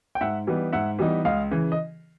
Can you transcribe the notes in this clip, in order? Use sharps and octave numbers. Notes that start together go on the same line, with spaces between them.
G5
G#2 E5 F#5
E3 G3 B3 D#4
G#2 E5 F#5
E3 G3 B3 D#4
C#2 D#5 F5
C#3 E3
D#5